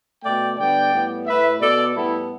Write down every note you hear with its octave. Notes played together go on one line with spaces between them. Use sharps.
B2 A3 D5 G5
D3 G3 B3 D5 G5
A2 G3 B3
A2 A3 B4 E5
B2 B3 A4 D5
A2 G3 B3 E4 A4